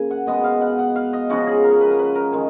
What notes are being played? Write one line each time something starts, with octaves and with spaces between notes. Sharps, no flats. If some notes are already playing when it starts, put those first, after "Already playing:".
Already playing: C#3 A#3 G#5
F#5
B2 G#3 B3 D#5
F5
F#5
F#5
F5
D#5
C#3 F3 G#3 C#4 F#4
G#4
A#4
B4
A#4
B4
A#4
D#3 G#3